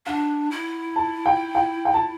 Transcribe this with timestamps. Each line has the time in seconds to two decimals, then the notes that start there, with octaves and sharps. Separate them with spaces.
0.06 D4 F#5
0.51 E4
0.96 A5
1.26 G5
1.55 G5
1.85 G5
1.94 A5